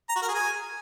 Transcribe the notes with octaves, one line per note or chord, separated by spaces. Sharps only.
A#5
F#4
A#4
G#4
G#5